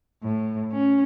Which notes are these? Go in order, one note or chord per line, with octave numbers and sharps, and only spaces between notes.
A2
C#4